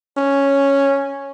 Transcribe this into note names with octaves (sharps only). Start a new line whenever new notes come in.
C#4